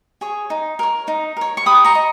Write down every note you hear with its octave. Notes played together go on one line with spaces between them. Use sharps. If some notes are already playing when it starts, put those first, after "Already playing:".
G#4 C#5
D#4
A#4 C#5
D#4
A#4 C#5
C#6
G4 B5 D#6
A#5 C#6
D#5